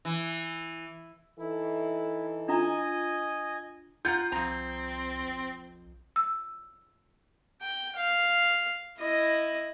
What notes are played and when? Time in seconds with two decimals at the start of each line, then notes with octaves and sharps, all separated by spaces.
0.05 E3
1.39 E3 D#4 E4 A4
2.48 D4 F4 D#5 G#5 A#5
4.05 F4 F#5 A#5 G6
4.32 C2 F2 C4 A#5
5.28 B1
6.16 E6
7.62 G5
7.96 F5
8.98 E4 D#5